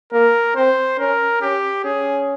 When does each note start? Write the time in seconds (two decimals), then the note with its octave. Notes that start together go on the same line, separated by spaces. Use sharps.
0.13 A#3 A#4
0.56 C4 C5
0.99 C#4 A#4
1.41 C#4 G4
1.84 C#4 G#4